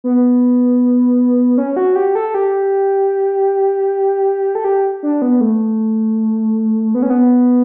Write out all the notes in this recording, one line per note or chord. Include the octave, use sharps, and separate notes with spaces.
B3
C#4
F#4
G4
A4
G4
A4
G4
D4
B3
A3
B3
C#4
B3